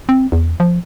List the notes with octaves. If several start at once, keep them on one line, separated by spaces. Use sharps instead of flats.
C4
E2
F3